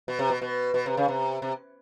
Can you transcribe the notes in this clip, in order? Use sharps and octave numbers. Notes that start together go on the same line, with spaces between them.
B2
C3
B2
B2
B2
C3
C#3
C3
C3